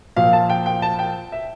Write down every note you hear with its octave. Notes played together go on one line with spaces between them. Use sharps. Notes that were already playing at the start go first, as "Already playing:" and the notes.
A#2 F3 F5
A5
G5
G5
A5
G5
E5